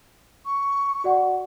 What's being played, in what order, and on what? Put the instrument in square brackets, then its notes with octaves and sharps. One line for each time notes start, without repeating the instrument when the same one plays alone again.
[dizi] C#6
[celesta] F#4 D5 F#5